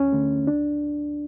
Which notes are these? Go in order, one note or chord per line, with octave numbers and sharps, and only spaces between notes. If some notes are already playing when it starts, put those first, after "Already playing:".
Already playing: D2 C#4
D3 A3
C#2 D4